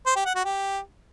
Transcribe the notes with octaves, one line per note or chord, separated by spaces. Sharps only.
C5
G4
F#5
F#4
G4